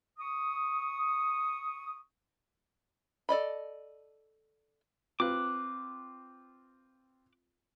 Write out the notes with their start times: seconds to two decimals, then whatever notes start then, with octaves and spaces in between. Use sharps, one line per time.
0.20 C#6 D#6
3.29 A4 D5 D#5 B5
5.20 C4 F4 B4 D6 F#6